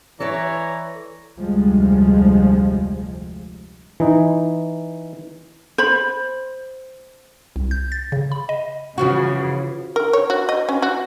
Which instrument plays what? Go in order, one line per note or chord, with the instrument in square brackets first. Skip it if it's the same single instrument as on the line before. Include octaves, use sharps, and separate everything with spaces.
[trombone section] E3 [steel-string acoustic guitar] A4 B4 D5 [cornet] C#5 [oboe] A#5
[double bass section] F1 D2 F3 G3 G#3
[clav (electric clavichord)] E3 D#4
[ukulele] C5 B5
[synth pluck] C2
G6
A6
C#3
B5
D#5
[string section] C#3 [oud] E3 F3 F#4
[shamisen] A#4
C#5
F#4
D#5
C#4
F#4